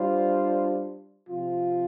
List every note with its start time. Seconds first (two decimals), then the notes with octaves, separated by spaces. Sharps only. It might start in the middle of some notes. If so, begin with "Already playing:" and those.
Already playing: G3 D4 F4 C5
1.28 C3 F3 C4 F4